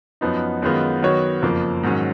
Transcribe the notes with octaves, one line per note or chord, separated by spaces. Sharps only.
F#2 F3 B3 D#4
F#2 D#3 G#3 B3 F4
D#3 F#3 B3 F#4 C#5
F#1 F2 F3 A#3
G#2 D#3 F#3 C#4